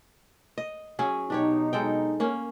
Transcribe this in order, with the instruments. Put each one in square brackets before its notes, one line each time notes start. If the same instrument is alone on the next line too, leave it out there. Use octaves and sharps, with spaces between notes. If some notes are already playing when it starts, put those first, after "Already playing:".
[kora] D#5
F#3 C#4 G#4
[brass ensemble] B2 F#3 D#4 [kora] D4 G4 C#5
[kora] G#3 A4 G5
A#3 C#4